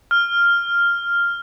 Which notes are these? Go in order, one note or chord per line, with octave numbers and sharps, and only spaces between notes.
F6